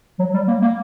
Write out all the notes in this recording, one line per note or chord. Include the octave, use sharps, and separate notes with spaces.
F#3
G3
A#3
A#3